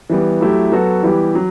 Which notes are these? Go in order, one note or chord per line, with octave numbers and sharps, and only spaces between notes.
E3 G3 B3
F#3 A3 E4 G4
F#3 B3 F#4 A4
E3 G3 B3 E4 G4
F#3